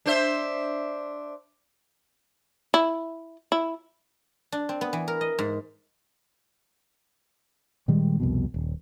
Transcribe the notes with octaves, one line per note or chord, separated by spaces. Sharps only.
D4 C5 E5
E4
E4
D4
C4
B3
E3
A#4
D#5
G#2
A#2 D#3 G3 G#3
C2 F2 B2
D#1